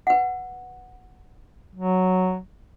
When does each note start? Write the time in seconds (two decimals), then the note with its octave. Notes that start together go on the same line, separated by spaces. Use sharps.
0.07 B4 F#5
1.76 F#3